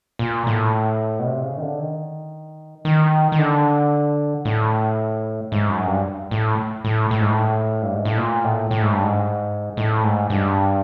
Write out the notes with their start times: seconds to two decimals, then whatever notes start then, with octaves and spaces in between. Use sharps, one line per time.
0.19 A#2
0.47 A2
1.19 B2
1.26 C3
1.43 C#3
1.58 D#3
1.62 D3
1.79 D#3
2.85 D#3
3.32 D#3
3.38 D3
4.45 A2
5.52 G#2
5.69 F#2
5.87 G2
6.31 A2
6.84 A2
7.11 A2
7.21 G#2
7.30 A2
7.82 G2
7.94 G#2
8.05 A2
8.17 A#2
8.44 A2
8.71 A2
8.82 G#2
8.93 G2
9.04 G#2
9.77 A2
10.03 G#2
10.30 G2